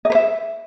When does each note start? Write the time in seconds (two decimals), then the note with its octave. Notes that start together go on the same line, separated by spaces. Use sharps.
0.05 D#5
0.10 B4
0.15 E5